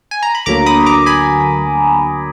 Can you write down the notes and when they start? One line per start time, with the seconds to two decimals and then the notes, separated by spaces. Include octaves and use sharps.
0.11 G#5
0.23 A#5
0.35 B5
0.46 D2 D3 F#3 A#3 A#5 D6
0.66 B5 D#6
0.86 A#5 D6
1.06 G#5 B5